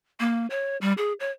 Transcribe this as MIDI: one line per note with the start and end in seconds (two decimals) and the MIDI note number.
0.20 0.47 58
0.50 0.77 73
0.81 0.93 55
0.97 1.13 68
1.20 1.31 73